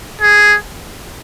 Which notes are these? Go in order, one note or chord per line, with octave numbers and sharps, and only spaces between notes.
G#4